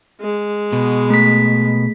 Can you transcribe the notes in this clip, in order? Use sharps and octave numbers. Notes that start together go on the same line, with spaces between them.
G#3
B2
A3 B6